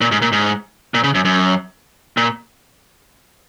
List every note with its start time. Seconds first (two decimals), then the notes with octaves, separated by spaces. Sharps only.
0.01 A#2
0.12 G#2
0.22 A#2
0.32 G#2
0.94 A#2
1.04 C#3
1.15 F#2
1.25 F#2
2.17 A#2